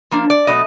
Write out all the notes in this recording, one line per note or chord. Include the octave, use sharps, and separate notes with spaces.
F3 A#3 D4
D5
B2 F#3 A3 D#5